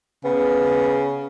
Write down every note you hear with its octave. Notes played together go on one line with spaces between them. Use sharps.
C#3 B3